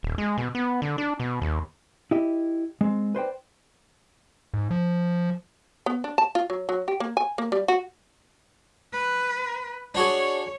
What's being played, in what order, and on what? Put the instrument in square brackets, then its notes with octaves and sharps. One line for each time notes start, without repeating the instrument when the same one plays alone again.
[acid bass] D#1
G#3
B2
B3
D3
D4
B2
D#2
[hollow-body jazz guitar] E4 G4 D#5
G#3 C4
B4 C5 D5 G5
[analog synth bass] G#2
F3
[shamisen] B3
D4
A5
F4
F#3
F#3
G4
A#3
G#5
A#3
G3
F#4
[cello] B4
[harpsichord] D4 F#4 G#4 [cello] C#5